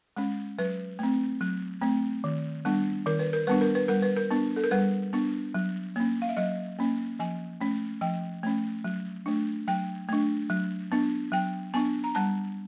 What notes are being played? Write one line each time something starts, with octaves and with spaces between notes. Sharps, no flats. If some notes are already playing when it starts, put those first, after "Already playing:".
G#3 C#4
F#3 B4
A3 C4
F#3
A3 C4
D#3
G3 B3 D4
D#3 A#4
B4
A#4
G3 B3 D4 B4
A#4
B4
G3 A#4
B4
A#4
B3 D4
A4
A#4
G3 B4
B3 D4
F#3
A#3 C#4
F5
E5
F#3 D#5
A#3 C#4
F3 G#5
A3 C#4
F3 G5
A3 C#4
F#3
A3 D4
F#3 G5
A3 D4
F#3
B3 D4
F#3 G5
B3 D4 G#5
A#5
G3 A5